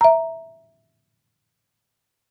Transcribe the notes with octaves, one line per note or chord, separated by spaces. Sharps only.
E5 A#5